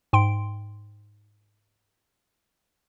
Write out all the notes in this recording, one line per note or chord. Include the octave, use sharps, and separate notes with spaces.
G#2 G5 C6 D7